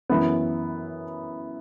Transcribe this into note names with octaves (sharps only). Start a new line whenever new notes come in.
F#2 E3 B3